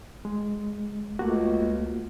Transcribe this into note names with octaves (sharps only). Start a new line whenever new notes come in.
G#3
C#2 A3 A#3 F#4